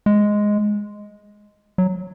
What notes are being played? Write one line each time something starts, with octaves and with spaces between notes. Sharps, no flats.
G#3
F#3